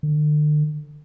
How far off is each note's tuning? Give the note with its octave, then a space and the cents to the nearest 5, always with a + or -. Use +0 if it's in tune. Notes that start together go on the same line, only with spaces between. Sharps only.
D3 +40